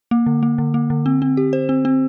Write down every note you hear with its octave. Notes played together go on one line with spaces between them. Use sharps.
A#3
D3
A#3
D3
A#3
D3
C4
C4
G4
C5
C4
C4